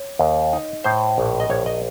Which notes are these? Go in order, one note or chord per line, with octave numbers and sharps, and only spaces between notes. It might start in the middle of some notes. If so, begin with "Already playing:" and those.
Already playing: C#5
D#2
D#4
A2 C5
A#1
D#5
A#1 C#5
D#5